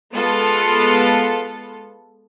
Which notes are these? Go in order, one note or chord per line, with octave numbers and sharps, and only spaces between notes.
G#3 B3 F4 A4